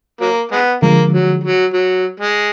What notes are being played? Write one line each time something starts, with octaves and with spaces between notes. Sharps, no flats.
F#3 A#3
G#3 B3
D3 F3 G#3 A#3
F#3
F#3
F#3
G#3